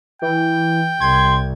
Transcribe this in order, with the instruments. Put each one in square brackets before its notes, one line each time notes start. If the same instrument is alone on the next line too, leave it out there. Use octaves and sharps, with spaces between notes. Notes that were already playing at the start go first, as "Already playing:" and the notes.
[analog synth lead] E3 [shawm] G5
[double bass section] C2 [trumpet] C6 [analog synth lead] G#6